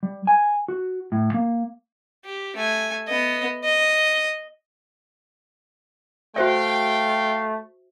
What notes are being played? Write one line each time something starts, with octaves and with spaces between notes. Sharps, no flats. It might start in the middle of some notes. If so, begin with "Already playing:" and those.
G3
G#5
F#4
A2
A#3
G4
A3 G#5
B3 D#5
D#5
A3 F#4 C5 E5 F5 G5